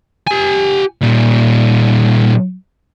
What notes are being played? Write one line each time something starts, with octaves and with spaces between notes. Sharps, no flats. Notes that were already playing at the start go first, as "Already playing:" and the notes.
G4 G#5
A#2 G3